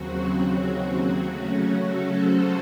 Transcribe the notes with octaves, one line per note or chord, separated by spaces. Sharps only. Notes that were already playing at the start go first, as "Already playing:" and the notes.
Already playing: D#2 C#3 F#3 C4 F#4
F#4
F#4
C#3 F#3 A3 C#4
A4
C5